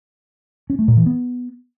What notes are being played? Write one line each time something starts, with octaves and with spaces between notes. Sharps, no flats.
C#4
A3
A#2
E3
B3